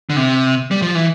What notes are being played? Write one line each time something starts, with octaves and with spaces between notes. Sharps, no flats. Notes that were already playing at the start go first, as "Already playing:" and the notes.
D3
C3
G3
F3
E3